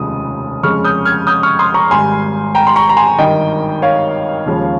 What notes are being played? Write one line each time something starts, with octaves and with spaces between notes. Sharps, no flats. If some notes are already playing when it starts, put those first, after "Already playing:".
Already playing: F1 D#2 C#3 F3 G#3 D#6
F2 C#3 G#3 C#6 F6
D#6 G6
F6 G#6
D#6 G6
C#6 F6
C6 D#6
A#5 C#6
G#1 G#2 G3 G#5 C6
G5 A#5
C6
A#5 C#6
A#5
G#5 C6
G#1 G2 D#3 D#5 G5
C#5 F5
D#2 C#3 F3 G#3